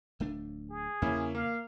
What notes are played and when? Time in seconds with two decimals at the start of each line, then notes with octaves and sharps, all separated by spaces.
0.20 D1 A3 D4
0.70 G#4
1.02 E2 C#3 A#3 C#4 E4
1.35 A#3 F5